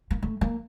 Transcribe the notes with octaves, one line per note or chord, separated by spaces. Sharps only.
A#3
A3
A#3